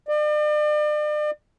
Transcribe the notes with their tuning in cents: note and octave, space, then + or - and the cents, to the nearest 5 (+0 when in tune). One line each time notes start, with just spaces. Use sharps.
D5 +40